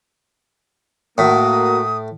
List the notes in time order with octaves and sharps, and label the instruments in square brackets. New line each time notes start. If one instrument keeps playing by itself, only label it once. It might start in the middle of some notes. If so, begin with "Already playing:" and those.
[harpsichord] A2 [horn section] A#3 F#4 [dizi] D#6